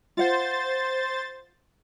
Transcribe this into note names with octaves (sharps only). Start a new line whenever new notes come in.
F4 C5 F#5 A6